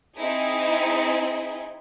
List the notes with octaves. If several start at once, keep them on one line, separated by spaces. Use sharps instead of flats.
C4 D#4 E4 G#4